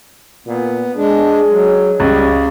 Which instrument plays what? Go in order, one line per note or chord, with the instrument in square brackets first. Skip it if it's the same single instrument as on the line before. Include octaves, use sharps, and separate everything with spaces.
[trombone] A#2 [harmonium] B3
[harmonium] G#3 D4 [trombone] G#4
[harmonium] F#3
[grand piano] C#2 [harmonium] G3